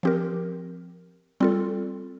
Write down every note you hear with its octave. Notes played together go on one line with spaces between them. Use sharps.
F3 C4 G4 A#4
G3 C4 F4 A4